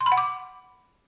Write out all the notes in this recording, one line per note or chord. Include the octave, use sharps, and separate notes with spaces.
C6
B5
F#5
D6